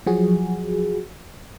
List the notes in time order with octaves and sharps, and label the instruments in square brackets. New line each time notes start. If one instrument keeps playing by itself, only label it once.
[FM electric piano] F3 F#3 F#4 G#4